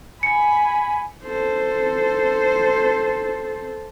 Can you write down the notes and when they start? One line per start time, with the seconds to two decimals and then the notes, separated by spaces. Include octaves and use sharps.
0.23 G#5 B5 C#7
1.24 A4 C5